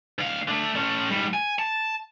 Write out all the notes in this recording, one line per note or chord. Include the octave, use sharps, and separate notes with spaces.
D2 F5
D3 A3
A3 C#4
G#2 G3
G#5
A5